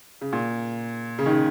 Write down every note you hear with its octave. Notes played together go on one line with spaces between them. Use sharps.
C#3
A#2
C#3
D#3
C#3